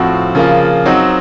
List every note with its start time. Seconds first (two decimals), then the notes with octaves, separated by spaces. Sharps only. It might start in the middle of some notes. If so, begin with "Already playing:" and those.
Already playing: A2 F3 C4 F#4
0.35 C#3 F3 A#3 F4
0.85 F#3 C4 D#4 F#4